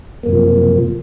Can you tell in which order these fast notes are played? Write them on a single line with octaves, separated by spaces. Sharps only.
A#3 F#2 C3 F3